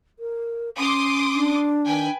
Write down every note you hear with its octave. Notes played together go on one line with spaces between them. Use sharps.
A#4
C#4 C6 D6 D#6
D4
D#3 B4 G5 G#5